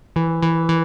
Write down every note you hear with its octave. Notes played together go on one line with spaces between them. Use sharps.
E3
E3
E3